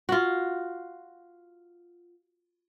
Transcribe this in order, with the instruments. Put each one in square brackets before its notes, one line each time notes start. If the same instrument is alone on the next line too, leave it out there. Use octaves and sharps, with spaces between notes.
[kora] F4 F#4